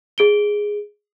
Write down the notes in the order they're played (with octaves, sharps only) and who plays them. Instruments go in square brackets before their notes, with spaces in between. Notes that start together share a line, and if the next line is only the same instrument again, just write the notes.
[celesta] G#4 D7 G7